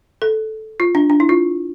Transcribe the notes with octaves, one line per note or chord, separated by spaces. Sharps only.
A4
F4
D4
D4
E4
F4